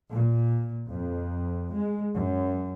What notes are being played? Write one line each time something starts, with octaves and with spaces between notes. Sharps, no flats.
A#2
F2
G#3
F#2